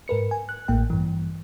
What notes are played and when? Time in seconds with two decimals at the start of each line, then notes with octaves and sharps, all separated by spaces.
0.08 G#2 A#4 B4 C#7
0.31 G#5
0.49 F#6
0.68 A1 A2 A#3 G5
0.90 G2 E3